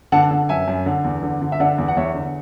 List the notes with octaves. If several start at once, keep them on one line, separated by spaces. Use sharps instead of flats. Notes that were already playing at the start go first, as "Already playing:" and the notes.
D3 F#5 A5
D3
F#2 E5 G#5
F#2
D3
E2
D3
D3
E5
D3 D5 F#5
E2
F#5
E2 C#5 E5
D3